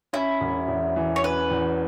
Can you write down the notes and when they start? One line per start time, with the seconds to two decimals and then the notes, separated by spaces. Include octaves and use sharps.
0.13 C#4 E4
0.40 E1
0.68 E2
0.96 E3
1.16 C#5
1.24 C#4 B4
1.51 E2